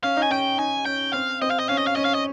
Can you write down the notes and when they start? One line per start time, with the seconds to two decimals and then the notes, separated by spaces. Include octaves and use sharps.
0.04 C#4 F5
0.17 D#4
0.23 G#5
0.31 C#4 G5
0.59 D#4 G#5
0.86 C#4 G5
1.13 C4 F5
1.42 C4 D#5
1.51 F5
1.59 D#5
1.69 C#4 F5
1.78 D#5
1.87 F5
1.96 C#4 D#5
2.05 F5
2.15 D#5